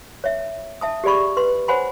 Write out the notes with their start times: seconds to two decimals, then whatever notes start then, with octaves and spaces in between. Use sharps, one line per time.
0.24 C#5 E5
0.81 E5 A5 D#6
1.04 G4 G#4 D5 B5 C#6
1.37 B4 C6
1.68 C5 C#5 F#5 G#5 B5 C6